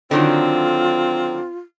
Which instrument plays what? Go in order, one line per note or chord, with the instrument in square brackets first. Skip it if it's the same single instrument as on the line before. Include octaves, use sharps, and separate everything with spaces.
[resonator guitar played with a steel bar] D3 D#3 F#3 [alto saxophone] C4 [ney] F4